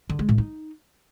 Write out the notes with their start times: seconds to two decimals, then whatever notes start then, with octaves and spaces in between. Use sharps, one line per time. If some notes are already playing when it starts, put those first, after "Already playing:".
0.10 D3
0.19 G#3
0.29 A2
0.38 D#4